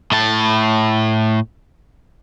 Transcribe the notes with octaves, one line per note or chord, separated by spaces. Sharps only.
A2 A5